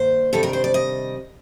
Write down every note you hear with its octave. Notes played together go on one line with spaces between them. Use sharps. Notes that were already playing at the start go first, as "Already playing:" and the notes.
Already playing: G2 D#3 A#3 C5
C3 D#3 G3 D4 A4
A#4
C5
D5
D#5